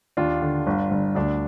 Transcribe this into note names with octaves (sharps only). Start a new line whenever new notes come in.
D#2 D4 F4
D3
G1
G1
D2 D4